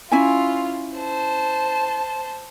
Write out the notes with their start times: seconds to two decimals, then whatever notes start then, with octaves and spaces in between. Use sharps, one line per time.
0.12 C#4 E4 F4 G#5
0.96 C5 A5